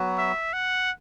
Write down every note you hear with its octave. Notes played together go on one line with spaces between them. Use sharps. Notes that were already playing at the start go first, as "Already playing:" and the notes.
Already playing: F#3 B3 F#4
E5
F#5